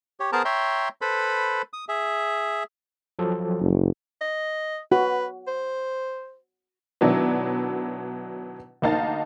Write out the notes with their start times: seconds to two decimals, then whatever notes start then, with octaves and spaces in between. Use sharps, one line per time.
0.20 G4 C#5
0.32 B3 G#4 A#4 C5 A5 A#5
0.45 C#5 E5 G5 A#5 C6
1.01 A4 B4 C5 B5
1.73 D#6
1.89 G#4 E5
3.19 F3 F#3 A4
3.60 F#1
4.21 D#5
4.92 F#4 B4
5.48 C5
7.01 B2 D#3 F#3 D4 E4
8.82 D2 A#3 D#4 F5 A5 A6